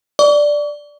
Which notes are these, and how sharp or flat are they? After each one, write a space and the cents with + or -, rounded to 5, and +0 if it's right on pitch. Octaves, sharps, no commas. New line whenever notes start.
D5 +0 C#6 +45